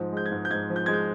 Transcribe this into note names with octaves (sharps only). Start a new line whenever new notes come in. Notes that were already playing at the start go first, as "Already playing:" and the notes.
Already playing: G#2 F3
G#3 G6
G#6
G#2
G6
G#2 G#6
F3
G6
G#3 G#6
G6